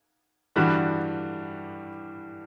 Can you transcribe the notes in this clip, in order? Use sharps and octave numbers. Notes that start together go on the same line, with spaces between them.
G2 D3 E3 G3 D4 F#4